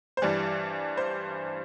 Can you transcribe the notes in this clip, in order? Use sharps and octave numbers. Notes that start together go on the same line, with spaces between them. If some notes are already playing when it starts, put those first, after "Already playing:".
C5
G2 E3 G3 D5
C5